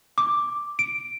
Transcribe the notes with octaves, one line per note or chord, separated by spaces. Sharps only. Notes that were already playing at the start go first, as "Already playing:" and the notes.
D6
D7